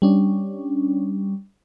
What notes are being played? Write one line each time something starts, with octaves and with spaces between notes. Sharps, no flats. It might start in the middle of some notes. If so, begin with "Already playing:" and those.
G3 C#4 D4